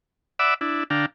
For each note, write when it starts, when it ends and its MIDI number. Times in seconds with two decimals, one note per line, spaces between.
0.39 0.54 74
0.39 0.54 76
0.39 0.54 78
0.39 0.54 83
0.39 0.54 86
0.39 0.54 88
0.61 0.84 62
0.61 0.84 64
0.90 1.06 50
0.90 1.06 62
0.90 1.06 77
0.90 1.06 79
0.90 1.06 82